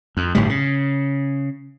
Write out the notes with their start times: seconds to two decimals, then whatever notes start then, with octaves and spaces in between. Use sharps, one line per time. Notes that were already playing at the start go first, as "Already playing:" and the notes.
0.17 F2
0.35 G1 A2 G3
0.49 C#3